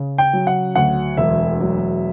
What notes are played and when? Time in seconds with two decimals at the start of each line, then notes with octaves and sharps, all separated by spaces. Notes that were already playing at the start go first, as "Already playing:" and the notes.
Already playing: C#3
0.18 G5
0.33 F#3
0.47 F#5
0.75 D2 F#5
1.17 E1 E5
1.61 F#3